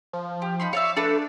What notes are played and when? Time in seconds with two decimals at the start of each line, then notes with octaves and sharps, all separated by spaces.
0.13 F3
0.42 G4
0.60 D#4 B5 C6
0.73 C#5 D5 E5 F5
0.97 A3 D4 A4 B4